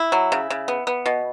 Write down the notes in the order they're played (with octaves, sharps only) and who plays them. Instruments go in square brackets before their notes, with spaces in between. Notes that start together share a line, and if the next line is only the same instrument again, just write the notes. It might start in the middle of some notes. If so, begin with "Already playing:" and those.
Already playing: [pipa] E4
F#3
C#3
C#3
B3
B3
B2